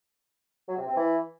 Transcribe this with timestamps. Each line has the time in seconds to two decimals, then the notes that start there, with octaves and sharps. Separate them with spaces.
0.68 F#3
0.78 C3
0.87 C4
0.97 E3